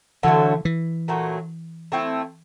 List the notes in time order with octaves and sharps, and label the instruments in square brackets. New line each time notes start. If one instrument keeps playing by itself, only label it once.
[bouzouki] D3 F#3 A3 [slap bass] E3
[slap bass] E3
[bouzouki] A#2 F#3 A3
A3 C4 E4